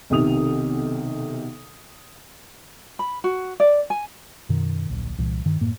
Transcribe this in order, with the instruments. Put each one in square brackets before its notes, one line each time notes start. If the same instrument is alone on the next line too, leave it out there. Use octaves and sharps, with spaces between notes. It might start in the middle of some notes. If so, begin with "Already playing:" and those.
[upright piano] B1 C3 D#3 D#6 F7
[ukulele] B5
F#4
D5
G#5
[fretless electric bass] F#2 B2 D#3
D1 A#1
C2 A#2 E3
G2 D#3
F#2 A2 A#3